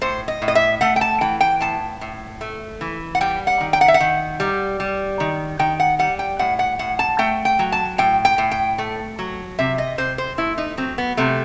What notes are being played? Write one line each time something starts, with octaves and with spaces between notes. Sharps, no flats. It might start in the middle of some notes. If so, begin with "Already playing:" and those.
A2 C5
D#5
A2
D#5
E5
A3 F#5
G5
A5
E3 G5
G5
A2 A5
A2
A3
E3
F#5
G3 G5
F#5
D#3
G5
F#5
E5
F#5
D#3
G3
G3
D#3
D#3 G5
F#5
G3 F#5
G5
A2 F#5
F#5
A2 F#5
A5
A3 G5
G5
F#3
A5
A2 G5
G5
A2
G5
A3
F#3
C3 E5
D#5
C3 C5
C5
A3 E4
D#4
F#3 C4
B3
C3 A3